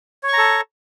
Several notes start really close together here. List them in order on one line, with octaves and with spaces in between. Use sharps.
C#5 C#6 A#5 A4